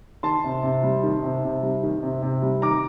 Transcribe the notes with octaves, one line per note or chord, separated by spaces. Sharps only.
D#3 A5 C6
C3
C3
G3
D#3
C3
C3
G3
D#3
C3
C3
G3
D#3 A#5 D6